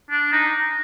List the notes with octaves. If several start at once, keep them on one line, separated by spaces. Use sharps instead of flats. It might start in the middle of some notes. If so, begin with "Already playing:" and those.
D4
D#4